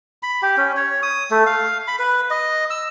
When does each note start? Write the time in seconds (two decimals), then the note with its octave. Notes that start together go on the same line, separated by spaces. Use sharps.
0.23 B5
0.42 G4
0.57 C#4
0.77 C#5
1.03 D#6
1.31 A3
1.46 F5
1.88 B5
1.99 B4
2.31 D#5
2.70 E6